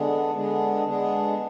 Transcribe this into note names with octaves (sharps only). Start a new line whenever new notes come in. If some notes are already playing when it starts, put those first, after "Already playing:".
Already playing: D3 G#3 B3 D4 G#4
D3 G#3 B3 D4 G#4
D3 G#3 B3 D4 G#4